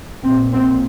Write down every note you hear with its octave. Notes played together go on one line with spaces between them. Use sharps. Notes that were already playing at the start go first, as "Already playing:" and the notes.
A#1 A#2 C4
C4